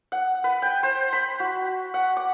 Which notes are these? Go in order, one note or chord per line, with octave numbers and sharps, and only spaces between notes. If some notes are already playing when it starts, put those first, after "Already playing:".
F#5
B4
G5
C5
B5
F#4
F#5
D6